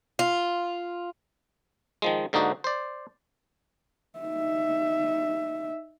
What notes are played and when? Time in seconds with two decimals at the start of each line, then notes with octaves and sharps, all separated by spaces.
0.19 F4
2.02 D#3 F3 G#3
2.33 G#2 D3 A#3 D#4 F#4
2.64 C5 D5
4.19 D#4 E5